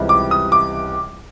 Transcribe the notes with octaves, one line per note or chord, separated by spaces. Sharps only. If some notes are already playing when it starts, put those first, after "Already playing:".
Already playing: C#2 C3 E3 G3
D6
D#6
D6